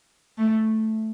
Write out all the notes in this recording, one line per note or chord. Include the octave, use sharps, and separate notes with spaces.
A3